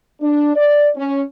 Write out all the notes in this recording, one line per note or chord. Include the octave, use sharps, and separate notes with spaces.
D4
D5
C#4